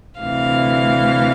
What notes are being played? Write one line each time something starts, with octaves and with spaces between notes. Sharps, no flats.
D2 C3 E3 F5